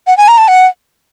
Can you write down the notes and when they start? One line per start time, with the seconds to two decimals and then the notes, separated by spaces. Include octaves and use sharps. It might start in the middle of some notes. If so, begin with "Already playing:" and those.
0.07 F#5
0.17 G#5
0.28 A#5
0.38 A5
0.48 F#5